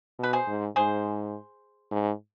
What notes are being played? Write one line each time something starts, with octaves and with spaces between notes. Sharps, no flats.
B2 B4
G#4 C5
G#2
G#2 G#4 C5
G#2